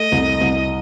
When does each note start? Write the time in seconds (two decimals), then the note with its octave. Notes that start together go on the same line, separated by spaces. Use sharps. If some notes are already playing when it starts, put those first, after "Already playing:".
Already playing: A3 D#5
0.12 C2
0.41 C2